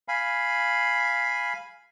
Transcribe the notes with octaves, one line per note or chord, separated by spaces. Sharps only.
F5 G#5 B5